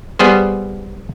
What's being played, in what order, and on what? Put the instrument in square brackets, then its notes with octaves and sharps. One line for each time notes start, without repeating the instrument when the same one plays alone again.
[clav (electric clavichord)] G3 B3 G#4 C5